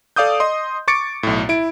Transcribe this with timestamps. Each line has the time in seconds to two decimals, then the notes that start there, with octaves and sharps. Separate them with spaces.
0.16 A4 D5 F5 D6 D#6 G6
0.40 D#5 C6 D#6
0.88 C#6 D6 A6 C#7 D7
1.23 B1 A2
1.49 E4 D7